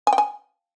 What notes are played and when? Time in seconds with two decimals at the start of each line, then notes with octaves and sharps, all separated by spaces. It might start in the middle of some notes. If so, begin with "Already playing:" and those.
0.07 G#5
0.13 G5
0.18 G#5